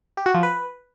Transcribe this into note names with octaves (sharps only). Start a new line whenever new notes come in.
G4
F#4
F3
B4